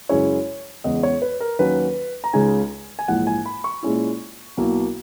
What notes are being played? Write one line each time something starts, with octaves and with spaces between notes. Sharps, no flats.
F#2 C#3 G#3 C#4 E4 C#5
E2 C#3 G#3 B3 D#5
C#5
B4
A#4
D#2 D#3 F#3 A#3 C#4 B4
A#5
C#2 C#3 G#3 D#4 G#5
G#5
A#1 G#2 E3 F#5
G#5
B5
C#6
A#2 G#3 C#4 E4
B1 B2 A#3 E4